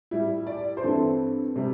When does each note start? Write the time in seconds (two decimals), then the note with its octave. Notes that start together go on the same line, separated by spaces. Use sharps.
0.11 A2 G3 E4
0.47 D5
0.77 C5
0.84 G2 E3 C4 E4 A4
1.56 C3 G3